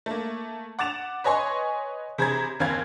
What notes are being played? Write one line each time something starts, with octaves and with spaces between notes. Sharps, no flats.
A3 A#3
F#5 D6 A6 E7 F7
B4 C#5 D#5 G#5 C6 C#6
C3 G#4 C5 A#5 B5 G#6
F#1 D#2 C4 F5 B5 G#6